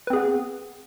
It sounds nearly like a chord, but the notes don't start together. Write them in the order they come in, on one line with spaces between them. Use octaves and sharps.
B4 C4 G#4 B3